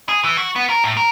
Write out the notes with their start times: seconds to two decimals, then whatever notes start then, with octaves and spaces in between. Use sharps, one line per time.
0.09 G#4
0.24 E3
0.37 F#4
0.56 B3
0.70 A#4
0.84 A2
0.97 A#4